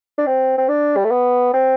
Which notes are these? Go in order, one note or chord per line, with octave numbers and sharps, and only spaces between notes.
D4
C4
C4
D4
G3
A3
B3
C4